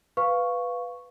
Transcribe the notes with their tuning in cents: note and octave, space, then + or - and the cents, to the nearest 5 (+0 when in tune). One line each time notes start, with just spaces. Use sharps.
B4 +5 F5 +0 C#6 +0